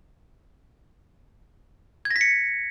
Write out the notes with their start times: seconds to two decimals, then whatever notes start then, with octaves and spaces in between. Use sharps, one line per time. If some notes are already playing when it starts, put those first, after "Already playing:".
2.05 G#6
2.11 A#6
2.16 B6
2.21 C#7